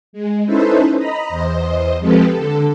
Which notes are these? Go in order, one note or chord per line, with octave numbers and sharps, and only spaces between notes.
G#3
C#4 D#4 E4 A4 B4 C5
D#5 A#5 B5
E2 C5 D#5
F3 G#3 C4 G4 A4 B4
D3 A4